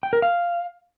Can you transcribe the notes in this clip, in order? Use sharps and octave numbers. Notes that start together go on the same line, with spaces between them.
G5
A#4
F5